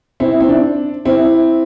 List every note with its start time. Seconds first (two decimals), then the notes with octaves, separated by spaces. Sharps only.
0.20 C4 E4
0.41 C4
0.49 D4
1.05 C4 E4